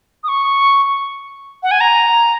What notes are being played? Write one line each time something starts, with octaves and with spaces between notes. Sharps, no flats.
D#6
C#6
F#5
G#5
A#5